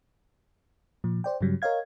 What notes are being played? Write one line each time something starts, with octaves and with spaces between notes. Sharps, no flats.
A#2 F3
C5 D5 G5
G2 C#3 F#3 G3
A#4 C#5 D#5 F5 G#6